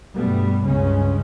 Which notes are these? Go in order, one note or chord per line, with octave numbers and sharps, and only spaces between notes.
G2 B2 G3 A3 B3
C#2 G2 C#3 G#3 C#4